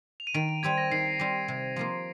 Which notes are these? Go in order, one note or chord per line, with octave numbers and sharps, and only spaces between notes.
F7
D#7
D#3 D7
D7
G3 C4 G4 G#6
A#6
D#3 C7
G3 C4 G4
C3
F3 A#3 F4